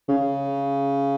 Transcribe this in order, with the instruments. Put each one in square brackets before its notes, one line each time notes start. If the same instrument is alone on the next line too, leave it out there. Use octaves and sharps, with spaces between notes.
[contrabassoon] C#3